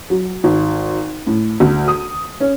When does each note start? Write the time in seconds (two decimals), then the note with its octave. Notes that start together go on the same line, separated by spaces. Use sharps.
0.10 F#3
0.44 G#1
1.27 A2
1.60 D2
1.88 D#6
2.40 C#4